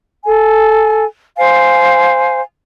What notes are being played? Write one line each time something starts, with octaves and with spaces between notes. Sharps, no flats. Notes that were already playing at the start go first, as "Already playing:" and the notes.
A4 G#5
C5 F5 G#5